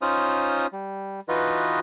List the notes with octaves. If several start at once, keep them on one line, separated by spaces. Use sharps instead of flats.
C#4 D#4 F4 C5 D#6 F6
G3
E3 D#4 F4 F#4 B4 D#5